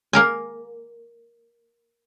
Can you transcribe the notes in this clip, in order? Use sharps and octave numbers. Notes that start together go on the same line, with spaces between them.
A#3 A#4 G#5